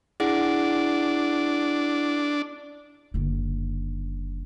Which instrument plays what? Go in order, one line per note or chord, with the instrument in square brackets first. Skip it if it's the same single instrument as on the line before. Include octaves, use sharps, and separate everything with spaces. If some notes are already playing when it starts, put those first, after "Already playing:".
[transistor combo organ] D4 [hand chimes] E4 G#4 F#5
[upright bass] F#1 D3